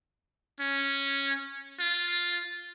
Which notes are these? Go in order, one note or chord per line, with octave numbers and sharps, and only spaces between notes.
C#4
F4